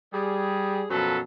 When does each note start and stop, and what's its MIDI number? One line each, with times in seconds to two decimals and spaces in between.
0.14 0.84 55
0.14 0.84 68
0.90 1.20 42
0.90 1.20 47
0.90 1.20 53
0.90 1.20 54
0.90 1.20 69
0.90 1.20 71